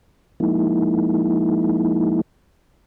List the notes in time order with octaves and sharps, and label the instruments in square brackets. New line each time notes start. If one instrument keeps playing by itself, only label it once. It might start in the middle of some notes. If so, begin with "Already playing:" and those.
[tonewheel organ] F3 G#3 A#3 D#4 E4